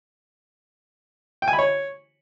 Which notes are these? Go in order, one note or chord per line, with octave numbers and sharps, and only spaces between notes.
G5
G#5
B5
C#5